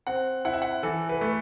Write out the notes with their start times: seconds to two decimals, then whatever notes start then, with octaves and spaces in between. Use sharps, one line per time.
0.07 C4 F#5
0.45 E4 F#5
0.53 E5
0.62 F#5
0.83 E3 A4
1.09 B4
1.21 A3